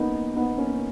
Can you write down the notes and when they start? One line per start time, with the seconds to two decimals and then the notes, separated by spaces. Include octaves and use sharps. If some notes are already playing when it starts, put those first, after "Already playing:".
Already playing: A#3 B3 C#4 D#4
0.36 B3 D#4
0.58 A#3 C#4